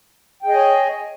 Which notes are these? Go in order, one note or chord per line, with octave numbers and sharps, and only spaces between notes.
G#4 C#5 D#5 G5 G#5